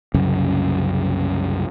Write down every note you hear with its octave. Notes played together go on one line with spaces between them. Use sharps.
C2 F#2 C#3